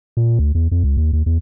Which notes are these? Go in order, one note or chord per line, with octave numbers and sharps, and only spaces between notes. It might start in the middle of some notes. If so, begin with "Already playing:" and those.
A#2
D2
E2
F2
C#2
D#2
D#2
E2